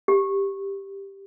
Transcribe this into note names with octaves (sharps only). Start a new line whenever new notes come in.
G4